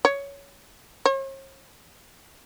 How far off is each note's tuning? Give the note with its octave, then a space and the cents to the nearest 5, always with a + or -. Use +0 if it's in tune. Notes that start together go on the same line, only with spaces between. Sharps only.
C#5 +15
C#5 -45